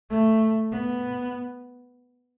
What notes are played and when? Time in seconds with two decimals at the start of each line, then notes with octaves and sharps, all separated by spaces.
0.10 A3
0.72 B3